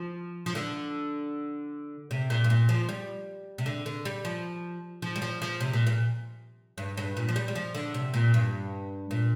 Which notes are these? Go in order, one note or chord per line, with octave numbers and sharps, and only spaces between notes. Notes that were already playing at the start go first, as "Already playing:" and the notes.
Already playing: F3
F3
D3
C3
A#2
G2
A#2
F3
G3
C3
D3
D3
G3
F3
F3
G3
F3
F3
C3
A#2
A#2
G2
G2
A#2
F3
G3
G3
F3
D3
C3
A#2
G2
A#2